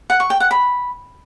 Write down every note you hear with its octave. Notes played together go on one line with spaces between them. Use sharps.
F#5
C#6
G5
F#5
B5